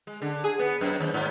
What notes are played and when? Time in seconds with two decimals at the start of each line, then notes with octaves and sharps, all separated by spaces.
0.07 G#3
0.22 D3
0.44 G#4
0.59 B3
0.81 F#2
1.00 D#2
1.14 G#2